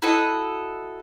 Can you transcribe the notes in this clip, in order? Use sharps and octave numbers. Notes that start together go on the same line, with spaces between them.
E4 F#4 A4 D#5